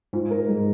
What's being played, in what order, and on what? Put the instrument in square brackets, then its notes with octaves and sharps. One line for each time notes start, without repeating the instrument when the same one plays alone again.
[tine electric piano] G#2 [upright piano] F4
[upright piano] A#4
G#2